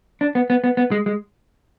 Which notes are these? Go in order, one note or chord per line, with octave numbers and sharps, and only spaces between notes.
D4
B3
B3
B3
B3
G#3
G#3